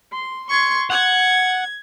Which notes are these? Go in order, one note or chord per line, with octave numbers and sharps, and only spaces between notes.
C6
C6 C#6 G#6
F#5 G#6